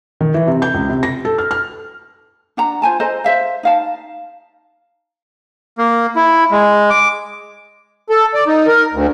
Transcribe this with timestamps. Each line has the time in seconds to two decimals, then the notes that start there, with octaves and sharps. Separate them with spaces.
0.21 D#3
0.34 E3
0.47 C3
0.62 G6
0.74 C#2
0.89 C3
1.03 A#6
1.25 A4
1.38 F6
1.51 F6
2.57 D4 F#5 A#5
2.82 F4 C5 G#5 A5
3.00 A4 C5 D#5 A#5
3.24 C5 E5 F5
3.63 D#4 F5 A5
5.78 A#3
6.16 E4
6.51 G#3
6.90 D6
8.10 A4
8.34 D5
8.47 D#4
8.67 A#4
8.93 D2